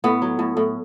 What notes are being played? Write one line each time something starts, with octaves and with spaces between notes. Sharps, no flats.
A2 B3
F#3
A2
A2